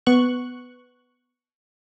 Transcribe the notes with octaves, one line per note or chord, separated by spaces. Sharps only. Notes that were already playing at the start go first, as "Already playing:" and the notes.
B3 C#6 F#6